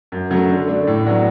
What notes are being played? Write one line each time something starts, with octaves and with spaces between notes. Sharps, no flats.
F#2
C#3 F#3 A3
D3
A3 D4
A2
F#3 B3 D4 F#4